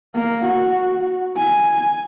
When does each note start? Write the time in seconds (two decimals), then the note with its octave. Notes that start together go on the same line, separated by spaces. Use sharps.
0.15 A#3
0.45 F#4
1.37 G#5